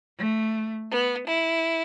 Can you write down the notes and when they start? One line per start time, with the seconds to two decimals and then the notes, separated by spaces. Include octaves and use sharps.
0.17 A3
0.90 B3
1.27 E4